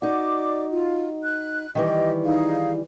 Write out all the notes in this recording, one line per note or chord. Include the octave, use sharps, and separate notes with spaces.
D#4 F#4 D5 D6
F4
F#6
D#3 E3 G3 G4 D#5
D#4 G#4 F5